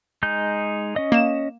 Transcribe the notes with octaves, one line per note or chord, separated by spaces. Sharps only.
G#3 D#4 G6
C#4 D#5
A#3 E7